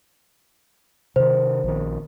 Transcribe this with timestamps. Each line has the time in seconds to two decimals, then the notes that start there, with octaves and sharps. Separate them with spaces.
1.16 C3 D#3 C5
1.64 A#1 D#3